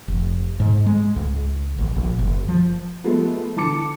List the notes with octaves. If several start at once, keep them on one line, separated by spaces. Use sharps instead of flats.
F1
G#2
G#3
C#2
A1
A#1
F#1
F3
F3 G#3 A3 B3
D3 E3 A5 D6 C#7